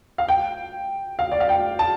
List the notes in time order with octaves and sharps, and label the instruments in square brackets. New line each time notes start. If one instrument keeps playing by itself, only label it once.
[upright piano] F5
G5
F5
D5
F5
G5
A5